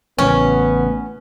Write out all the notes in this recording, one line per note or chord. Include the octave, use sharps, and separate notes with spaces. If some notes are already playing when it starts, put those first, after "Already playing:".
A1 A2 C#3 B3 C#4